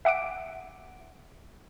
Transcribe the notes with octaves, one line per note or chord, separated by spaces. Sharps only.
E5 F#5 D6 D7